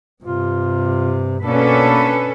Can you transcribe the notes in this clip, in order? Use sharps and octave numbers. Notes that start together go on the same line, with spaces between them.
G2 C3 F4
B2 A#3 C#4 D4 A4 B4